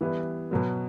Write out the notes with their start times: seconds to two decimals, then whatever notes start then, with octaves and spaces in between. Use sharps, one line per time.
0.01 E3 G3 B3 E4
0.51 B2 F#3 B3